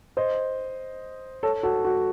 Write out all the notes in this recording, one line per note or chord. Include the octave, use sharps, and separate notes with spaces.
C5 D#5
A4 C#5
F#4 A4
F#4